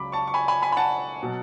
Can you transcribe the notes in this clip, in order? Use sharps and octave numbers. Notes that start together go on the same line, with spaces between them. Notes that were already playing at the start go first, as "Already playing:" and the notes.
Already playing: C#2 C#3 F#3 B5 D6
A5 C#6
C#6
G#5 B5
G#5 B5
G#5 B5
B5
F#5 A5
B2 F#3